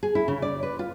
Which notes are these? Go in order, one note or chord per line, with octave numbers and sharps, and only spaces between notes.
G#4
E4
C#3
D5
B4
F4